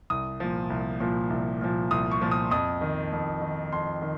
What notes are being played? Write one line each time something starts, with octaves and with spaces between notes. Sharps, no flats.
C2 D#6
A#2 F3
C2
A#2 F3
C2
A#2 F3
C2 D#6
C#6
A#2 F3
D#6
F2 D#6
D#3
F2
D#3
F2 C6
D#3